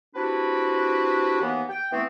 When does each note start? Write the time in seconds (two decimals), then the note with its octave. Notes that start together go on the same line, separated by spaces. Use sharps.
0.16 C4 D4 E4 F#4 G4 B4
1.41 D#2 E3 A#3 B3
1.69 G5
1.92 E3 A3 B3 C4